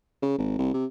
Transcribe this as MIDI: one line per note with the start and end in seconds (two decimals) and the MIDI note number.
0.22 0.36 49
0.38 0.54 32
0.59 0.69 36
0.73 0.85 48